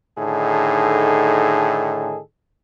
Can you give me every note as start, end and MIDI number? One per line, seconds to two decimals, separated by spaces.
0.18 2.18 45
0.18 2.18 50
0.18 2.18 51
0.18 2.18 63
0.18 2.18 68
0.18 2.18 69